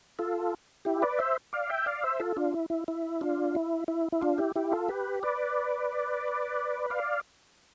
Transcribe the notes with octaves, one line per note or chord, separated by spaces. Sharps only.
F4 A4
E4 G4
B4 D5
C5 E5
D5 F5
E5 G5
D5 F5
C5 E5
F4 A4
D4 F4
E4
E4
E4
D4 F4
E4
E4
E4
D4 F4
E4 G4
E4 G4
F4 A4
G4 B4
B4 D5
D5 F5